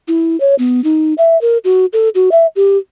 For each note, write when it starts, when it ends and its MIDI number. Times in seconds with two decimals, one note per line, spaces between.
0.08 0.39 64
0.40 0.55 73
0.59 0.83 59
0.84 1.14 63
1.18 1.40 76
1.41 1.58 70
1.65 1.86 66
1.93 2.09 69
2.15 2.30 66
2.32 2.47 76
2.56 2.77 67